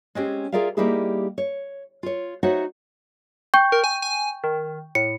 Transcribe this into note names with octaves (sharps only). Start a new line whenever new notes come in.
G#3 C4 C#4 G4
F4 G#4 A#4 D5 E5 F5
G3 A#3 D#4 E4 G4 G#4
C#5
F4 C#5
D#4 F#4 C5 C#5 E5 F#5
G5 C#6 G6
A#4
G#5
G#5
D#3
A2 C#7